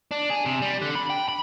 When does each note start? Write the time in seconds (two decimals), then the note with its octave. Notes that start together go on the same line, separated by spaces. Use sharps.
0.11 D4
0.30 G#4
0.46 C3
0.62 G3
0.82 D3
0.95 B5
1.10 G5
1.29 B5